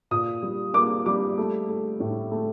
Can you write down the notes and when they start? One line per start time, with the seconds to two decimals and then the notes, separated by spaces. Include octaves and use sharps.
0.11 A#2 D#6
0.43 G3
0.74 A#3 D6
1.06 G3 D6
1.38 A3
1.69 A3
2.00 A2
2.32 A3